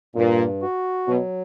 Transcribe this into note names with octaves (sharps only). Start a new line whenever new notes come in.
G2 A#2
F#4
B2 F#3